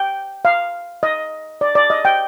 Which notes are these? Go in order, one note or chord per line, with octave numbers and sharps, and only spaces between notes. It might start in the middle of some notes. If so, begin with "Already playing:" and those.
Already playing: G5
F5
D#5
D5
D5
D#5
G5